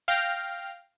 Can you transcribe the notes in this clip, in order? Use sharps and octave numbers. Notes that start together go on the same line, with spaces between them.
F5 G5 F6 A#6